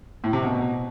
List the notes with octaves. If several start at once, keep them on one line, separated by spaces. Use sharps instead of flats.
A2
C3
B2